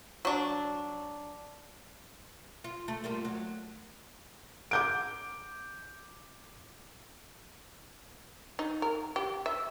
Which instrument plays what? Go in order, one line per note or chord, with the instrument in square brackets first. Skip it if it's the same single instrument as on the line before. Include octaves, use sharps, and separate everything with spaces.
[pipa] F#3 D4
[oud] F4
A3
G3 A#3 F4
F#3
[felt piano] D6 G6 D7
[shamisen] D#4
A#4
G4
E5